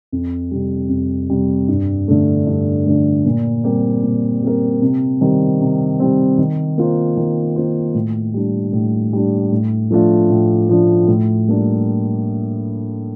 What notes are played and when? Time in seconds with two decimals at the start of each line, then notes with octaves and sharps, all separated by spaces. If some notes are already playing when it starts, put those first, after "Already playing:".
0.12 F2
0.51 C3 G3
0.90 F2
1.30 C3 G3
1.68 G2
2.08 D3 A3
2.47 G2
2.86 D3 A3
3.26 A#2
3.64 G3 C4 G4 A#4
4.03 A#2
4.42 G3 C4 G4 A#4
4.82 C3
5.21 D#3 G3 C4
5.60 C3
6.00 D#3 G3 C4
6.38 D#3
6.78 A#3 F4 C5
7.17 D#3
7.56 A#3 F4 C5
7.94 A2
8.34 G3 D4
8.73 A2
9.13 G3 D4
9.52 A2
9.91 F3 A3 D4 F4
10.30 A2
10.69 F3 A3 D4 F4
11.08 A2
11.47 G3 A#3 D4